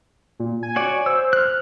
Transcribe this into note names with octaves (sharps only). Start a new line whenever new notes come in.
A#2
G#5
F#4 C#5 D5
C5 E6
F6 F#6